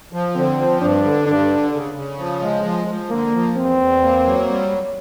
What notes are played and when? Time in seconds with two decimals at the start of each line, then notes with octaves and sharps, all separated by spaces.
0.13 F3
0.35 D3 C4
0.58 F3
0.81 G2 D4
1.04 D3
1.27 G2 D4
1.50 D3
1.72 C#3
1.95 C#3
2.18 F3
2.42 G#3
2.64 F3
2.87 F3
3.10 D3 A#3
3.34 F3
3.56 E2 C4
3.80 E2
4.02 A#3
4.25 F#3
4.48 G3